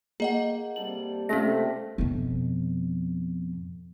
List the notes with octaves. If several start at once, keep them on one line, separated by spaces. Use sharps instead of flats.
A#3 G#4 D#5 F#5 G5
C3 G3 A4 F#7
C3 A3 C#4 F4 F5 A#6
F2 B2